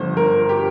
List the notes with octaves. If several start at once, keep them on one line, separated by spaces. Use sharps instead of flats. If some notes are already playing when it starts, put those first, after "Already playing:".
Already playing: G1 G2 F3 C5
A#4
G4